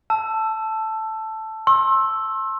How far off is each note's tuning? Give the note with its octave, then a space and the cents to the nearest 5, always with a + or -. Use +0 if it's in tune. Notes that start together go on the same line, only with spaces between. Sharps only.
A5 +0 E6 +15
C6 +35 E6 +0